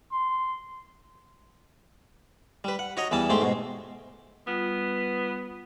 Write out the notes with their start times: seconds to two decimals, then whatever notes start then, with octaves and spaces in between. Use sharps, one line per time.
0.12 C6
2.64 G3 B4
2.79 F#5
2.97 F#4 C#5 D#5 A#5
3.11 E2 E3 G3 A5
3.30 G#2 A3 G4 C6
3.42 G#2 B2
4.47 G3 B3 F4 D#6